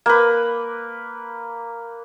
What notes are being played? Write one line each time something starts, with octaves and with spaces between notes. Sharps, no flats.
A#3 B4